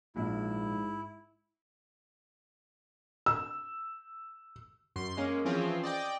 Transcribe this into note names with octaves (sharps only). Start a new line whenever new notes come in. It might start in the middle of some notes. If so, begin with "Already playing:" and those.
A#1 G#2 E4
E6
F#2 C6
G#3 A#3 C#4
E3 F3 C4 C#4 F4 G#4
D5 D#5 G5